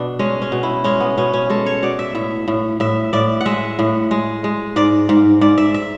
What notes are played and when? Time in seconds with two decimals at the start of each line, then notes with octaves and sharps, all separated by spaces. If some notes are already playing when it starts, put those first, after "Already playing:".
Already playing: B2 D4
0.19 G#3 C#4
0.42 C#4
0.52 B2
0.63 E4
0.84 G#3 C#4
1.00 B3
1.17 B2 C#4
1.33 C#4
1.50 G#3 A4
1.66 C#5
1.83 B2 D5
1.99 E5
2.15 A2 E5
2.48 A2
2.80 A2 E5
3.13 A2 D5
3.41 F#5
3.46 G#3 E5
3.79 A2
4.11 G#3
4.44 G#3
4.76 G#2 D5
5.09 G#2
5.41 G#2 D5
5.58 E5
5.74 E5